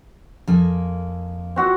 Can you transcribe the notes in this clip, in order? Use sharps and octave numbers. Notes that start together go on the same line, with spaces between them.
F2 A#3 G#5
C4 F#4 F#5